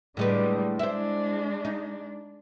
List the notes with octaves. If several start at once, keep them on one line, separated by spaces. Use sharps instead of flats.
A2 D3 G3 G#3 B4
G#3 D4 E4 C5
D#4